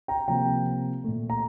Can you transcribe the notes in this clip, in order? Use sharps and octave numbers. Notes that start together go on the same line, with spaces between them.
G5 A#5
C3 F3 A#3 G5 A#5
A#2 A3
A#5